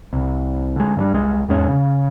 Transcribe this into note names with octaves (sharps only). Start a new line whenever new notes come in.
C2
D3 G#3
G2 F#3 G3
C2 G#3
E2 G#2 G#3 C#4
C#3